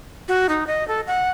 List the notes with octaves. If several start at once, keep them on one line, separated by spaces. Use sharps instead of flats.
F#4
D#4
D#5
A4
F#5